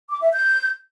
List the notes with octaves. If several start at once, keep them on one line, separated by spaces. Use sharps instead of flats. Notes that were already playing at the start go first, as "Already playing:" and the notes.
D6
E5
G6